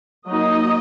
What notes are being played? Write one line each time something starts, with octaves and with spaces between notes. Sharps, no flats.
F#3 A#3 D#4 D#5